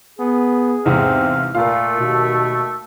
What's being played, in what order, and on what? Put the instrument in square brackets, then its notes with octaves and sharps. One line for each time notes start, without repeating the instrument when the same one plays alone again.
[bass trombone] B3 [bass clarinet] G#4
[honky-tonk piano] E2 G#2 C3 [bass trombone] C4 [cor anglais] F5
[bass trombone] A#2 [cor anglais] A3 [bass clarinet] F4 [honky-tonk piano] A#4 F5
[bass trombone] D#2 [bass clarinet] B2